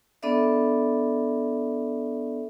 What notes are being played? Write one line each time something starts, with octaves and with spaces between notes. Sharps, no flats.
B3 D4 A4 D5 E5